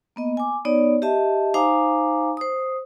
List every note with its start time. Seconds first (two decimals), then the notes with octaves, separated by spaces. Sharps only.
0.16 A#3 B3 D#5
0.37 G#5 D6
0.65 B3 D#4 C#5 D5
1.02 G4 D#5 E5 A5
1.54 D#4 C5 F5 G#5 A#5 D6
2.37 C5 D#6